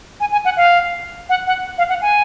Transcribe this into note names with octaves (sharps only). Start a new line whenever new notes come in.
G#5
G#5
F#5
F5
F#5
F#5
F5
F#5
G#5